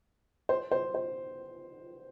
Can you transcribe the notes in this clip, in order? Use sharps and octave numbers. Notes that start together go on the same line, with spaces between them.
C5
C5
C5